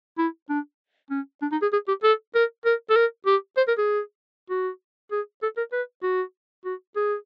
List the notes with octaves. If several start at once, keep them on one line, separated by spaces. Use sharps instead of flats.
E4
D4
C#4
D4
D#4
G#4
G#4
G4
A4
A#4
A#4
A4
A#4
G4
C5
A#4
G#4
F#4
G#4
A4
A#4
B4
F#4
F#4
G#4